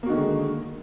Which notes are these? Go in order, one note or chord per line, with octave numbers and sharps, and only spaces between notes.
D3 D#3 G#3 A#3 F#4